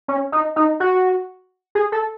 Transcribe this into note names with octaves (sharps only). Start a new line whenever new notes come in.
C#4
D#4
D#4
F#4
G#4
A4